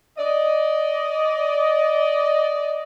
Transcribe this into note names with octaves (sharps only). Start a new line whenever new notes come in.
D5 D#5